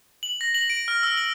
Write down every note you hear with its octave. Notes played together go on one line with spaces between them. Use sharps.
F#7
A#6
F#7
D7
F6
E6
F#7